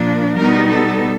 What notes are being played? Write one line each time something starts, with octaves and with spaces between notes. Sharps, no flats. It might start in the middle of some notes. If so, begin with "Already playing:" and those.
Already playing: A#2 F3 A#3 D4
B2 G3 B3 D#4 A#4
A4